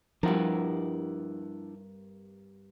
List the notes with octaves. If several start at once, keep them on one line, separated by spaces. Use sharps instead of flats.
G2 F3 C4 D4 E4 A#4 F#5